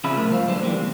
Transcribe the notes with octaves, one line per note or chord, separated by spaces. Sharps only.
C#3 F3 C4 G#4 E5 B5
B1 A#2 A3 A#4
G2 F3 C5 F5
F2 D3 F#3 A4 B4 C5
E2 E3 F3 G3 G#3 A#3
D#2 C3